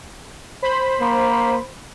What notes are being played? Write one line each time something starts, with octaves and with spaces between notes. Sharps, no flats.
C5 B5
A#3